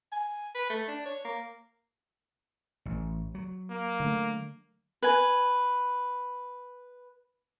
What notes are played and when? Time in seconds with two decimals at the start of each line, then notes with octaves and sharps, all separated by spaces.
0.12 G#5
0.55 B4
0.70 A3
0.88 D4
1.06 C#5
1.25 A#3
2.86 A1
3.35 F#3
3.70 A#3
4.00 D3 A3
5.02 B4 G#5